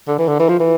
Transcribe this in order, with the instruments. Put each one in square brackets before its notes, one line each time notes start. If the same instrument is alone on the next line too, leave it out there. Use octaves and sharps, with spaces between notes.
[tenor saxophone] D3
E3
D3
E3
F3
E3